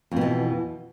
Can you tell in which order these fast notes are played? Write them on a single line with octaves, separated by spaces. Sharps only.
F2 B2 E3